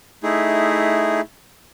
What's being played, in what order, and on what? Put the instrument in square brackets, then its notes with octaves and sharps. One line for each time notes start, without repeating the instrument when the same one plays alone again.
[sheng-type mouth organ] A3 D#4 E4 G#4